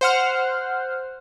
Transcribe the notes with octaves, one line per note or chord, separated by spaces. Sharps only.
C5 F#5 F6